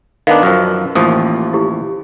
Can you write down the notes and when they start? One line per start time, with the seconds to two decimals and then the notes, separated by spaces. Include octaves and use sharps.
0.27 D#3 B3 D4 F5
0.43 F#2 F3
0.95 A1 D#2 F3 D#6
1.53 E4 G4